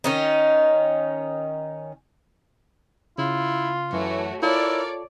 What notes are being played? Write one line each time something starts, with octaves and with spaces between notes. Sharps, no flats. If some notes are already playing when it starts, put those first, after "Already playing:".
D#3 C#4 D#4
C#3 E4 F4
F#2 E3 A3 F#4 C#5 C#6
E4 F4 A4 A#4 C#5 D5 A5